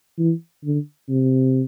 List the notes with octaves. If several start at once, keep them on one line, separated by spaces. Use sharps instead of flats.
E3
D3
C3